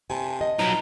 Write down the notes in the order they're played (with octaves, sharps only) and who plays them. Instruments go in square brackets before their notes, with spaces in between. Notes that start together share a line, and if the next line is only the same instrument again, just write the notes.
[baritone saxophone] C3 [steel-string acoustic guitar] G#5 A5
[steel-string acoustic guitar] D#5
[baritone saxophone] F3 [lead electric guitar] F#3 D#4 [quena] A#5